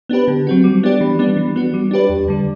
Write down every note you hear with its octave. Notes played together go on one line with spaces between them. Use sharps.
B3 D4 G4 B4
D3
F#3 C4 F#4
G3
B3 D4 G4 D5
E3
G3 B3 D4
E3
B3 F#4
G3
D4 G4 B4 D5
E2
D3 G3